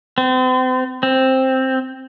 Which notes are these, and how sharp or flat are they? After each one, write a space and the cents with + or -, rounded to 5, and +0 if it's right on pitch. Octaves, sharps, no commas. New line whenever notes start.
C4 -40
C4 +5